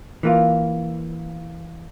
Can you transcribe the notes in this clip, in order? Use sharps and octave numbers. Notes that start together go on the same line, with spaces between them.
E3 A#3 F4